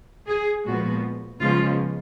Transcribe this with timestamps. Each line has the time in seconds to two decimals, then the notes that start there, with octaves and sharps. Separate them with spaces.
0.27 G#4
0.65 A#2 F3 G#3 B3 F#4
1.40 C#3 F3 G#3 B3 F4